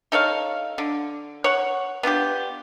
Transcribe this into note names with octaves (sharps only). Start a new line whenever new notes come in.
D#4 A4 C#5 F5
D3
C#5 F#5
B3 D4 F4 G4